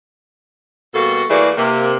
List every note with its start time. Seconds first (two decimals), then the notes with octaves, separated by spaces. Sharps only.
0.94 B2 G3 A#3 F#4 A4
1.30 E3 A3 A#3 F#4 G#4 D5
1.57 C3 A#3